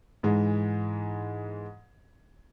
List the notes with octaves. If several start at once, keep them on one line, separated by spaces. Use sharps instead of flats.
G#2 E3 G#3